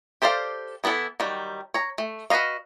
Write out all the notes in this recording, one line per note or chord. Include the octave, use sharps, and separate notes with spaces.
G4 A4 C5 D5 F5
E3 B3 D#4 E4 A4
D#3 F#3 G3
C#5 A#5
A3
F#4 B4 C#5 D#5 F5